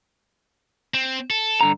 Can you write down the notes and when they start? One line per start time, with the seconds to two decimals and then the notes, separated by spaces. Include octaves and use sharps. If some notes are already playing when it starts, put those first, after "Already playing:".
0.94 C4
1.30 A4
1.61 G2 D3 A#5